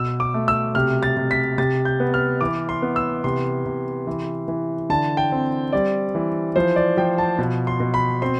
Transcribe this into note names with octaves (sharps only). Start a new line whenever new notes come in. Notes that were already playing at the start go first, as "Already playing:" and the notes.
Already playing: B2 E6
D6
A3
E6
C3 F6
A6
C3
B6
C3 A6
G6
B3
F6
E3 D6
C6
B3
E6
C3 C6
C3
E3
E3
D3 A5
G5
C4
G3 D5
E3
F3 C5
D5
F3 G5
A5
B2
C6
B2
B5
C4 C6